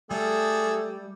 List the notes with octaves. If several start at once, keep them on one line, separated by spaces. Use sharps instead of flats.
G3 A3 D4 G#4 A4